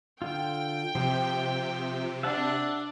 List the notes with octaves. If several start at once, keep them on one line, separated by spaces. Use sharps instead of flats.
D3 F4 G5
C3 F3 G4
D4 E5 F#5 A5